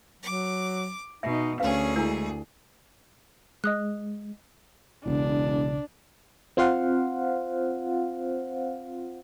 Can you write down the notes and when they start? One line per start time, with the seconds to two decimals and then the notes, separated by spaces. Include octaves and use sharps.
0.23 F#3 D6
1.23 B2 D#4 E5
1.60 D2 C#4 G#4 B4 F5
1.96 G#3 D4 E4 A#4
3.64 G#3 D#5 D#6 F#6
5.06 E1 B1 C#3 D4
6.57 C4 F4 C5 F5 F#5